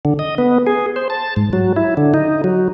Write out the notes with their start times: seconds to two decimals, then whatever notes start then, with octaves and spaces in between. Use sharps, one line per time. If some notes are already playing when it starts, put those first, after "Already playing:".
0.05 D3
0.19 D#5
0.38 B3
0.67 G#4
0.96 C5
1.10 A5
1.36 G#2
1.53 F#3
1.76 E4
1.97 D3
2.14 D#4
2.44 F#3